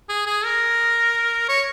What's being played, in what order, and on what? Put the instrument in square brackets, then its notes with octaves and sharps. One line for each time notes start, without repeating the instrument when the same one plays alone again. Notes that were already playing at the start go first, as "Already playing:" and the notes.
[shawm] G#4
G#4
A#4
C#5